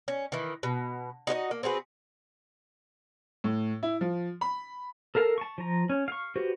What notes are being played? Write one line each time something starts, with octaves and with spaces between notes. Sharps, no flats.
C#4
D#3 E3
B2
D#4 F#4 C5 D#5
A#3
C4 F#4 G#4 B4
A2
E4
F3
B5
A4 A#4 F5 A5
A5 C#6
F3 A#5
C#4
F5 C#6
F#4 G4 B4 C5